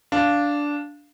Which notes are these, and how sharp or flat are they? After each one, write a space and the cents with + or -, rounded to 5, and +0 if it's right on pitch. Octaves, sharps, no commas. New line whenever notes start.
D4 -10 F5 +0